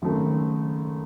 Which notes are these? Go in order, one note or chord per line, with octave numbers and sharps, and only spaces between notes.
F#1 F#2 D#3 A3 C4